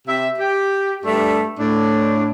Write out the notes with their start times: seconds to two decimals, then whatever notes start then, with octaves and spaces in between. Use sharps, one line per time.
0.07 C3 G4 E5
0.39 G4
1.05 G2 G3 A3 D4 E5
1.59 A2 D4